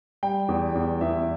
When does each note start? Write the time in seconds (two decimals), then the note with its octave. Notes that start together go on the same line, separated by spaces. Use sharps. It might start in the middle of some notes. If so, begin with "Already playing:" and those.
0.23 G3 G5
0.49 E2
0.75 E2
1.01 E2 E5